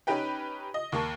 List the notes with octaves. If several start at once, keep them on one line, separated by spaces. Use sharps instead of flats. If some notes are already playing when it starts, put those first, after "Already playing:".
C#4 D#4 G4 B4 G5
D#5
D#2 A#3 A5 C#6